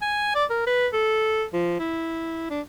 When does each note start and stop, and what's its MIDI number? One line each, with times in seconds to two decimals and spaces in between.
0.02 0.32 80
0.35 0.45 74
0.50 0.65 70
0.67 0.87 71
0.93 1.44 69
1.53 1.78 53
1.79 2.45 64
2.50 2.61 62